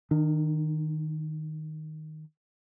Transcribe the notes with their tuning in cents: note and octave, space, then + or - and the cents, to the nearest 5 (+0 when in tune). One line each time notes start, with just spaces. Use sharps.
D#3 +0 D4 +45